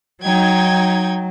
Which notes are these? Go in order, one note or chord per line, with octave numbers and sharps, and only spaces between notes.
F#3 D#4 G5 G#6